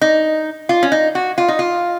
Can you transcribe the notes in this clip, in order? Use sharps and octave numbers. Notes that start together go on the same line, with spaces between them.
D#4
F4
C#4
D#4
F#4
F4
D#4
F4